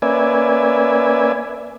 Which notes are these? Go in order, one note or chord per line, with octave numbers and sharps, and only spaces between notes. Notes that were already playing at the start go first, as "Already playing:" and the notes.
A#3 C#4 B4 D5 E5 G#5